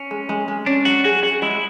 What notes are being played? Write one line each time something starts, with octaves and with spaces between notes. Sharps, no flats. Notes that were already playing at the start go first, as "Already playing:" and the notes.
Already playing: C#4
G#3
G#3
G#3
C#4 D4
F#3 F#4
F#4 G#4
F#4 G#4
G#3 E4